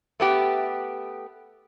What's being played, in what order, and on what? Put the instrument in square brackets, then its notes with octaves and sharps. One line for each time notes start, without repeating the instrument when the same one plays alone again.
[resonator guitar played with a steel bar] A3 B3 G4